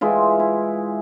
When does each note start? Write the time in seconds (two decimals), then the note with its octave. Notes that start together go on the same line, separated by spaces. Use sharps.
0.01 E3 G#3 E4 F4
0.40 E4